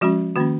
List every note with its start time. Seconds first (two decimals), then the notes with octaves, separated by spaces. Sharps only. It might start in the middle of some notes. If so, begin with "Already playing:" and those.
0.01 F3 G#3 C#4 F#4
0.36 D#3 A#3 C#4 F#4